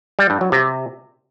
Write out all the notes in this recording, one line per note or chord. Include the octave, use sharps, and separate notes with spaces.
G3
G2
F#3
C3